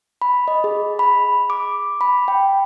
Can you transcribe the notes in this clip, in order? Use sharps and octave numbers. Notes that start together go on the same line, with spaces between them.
B5
D#5
G#4
B5
D6
B5
G5